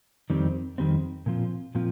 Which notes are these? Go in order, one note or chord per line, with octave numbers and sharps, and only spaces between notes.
F2 D#3 G3 C4
F2 D#3 G3 C4
A#2 F3 C4 F4
A#2 F3 C4 F4